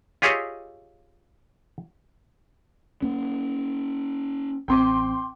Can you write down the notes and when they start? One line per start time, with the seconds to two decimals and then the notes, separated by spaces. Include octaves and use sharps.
0.22 F4 G4 G#4 C#5 D#5 E5
3.02 A#3 C#4
4.68 A1 C4 G5 C6 D6